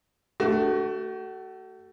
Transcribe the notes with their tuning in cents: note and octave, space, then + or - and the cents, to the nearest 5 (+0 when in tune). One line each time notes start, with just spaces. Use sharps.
A3 +10 F#4 +35